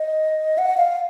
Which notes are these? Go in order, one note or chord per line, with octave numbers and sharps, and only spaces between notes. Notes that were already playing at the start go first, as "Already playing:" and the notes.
Already playing: D#5
F#5
F5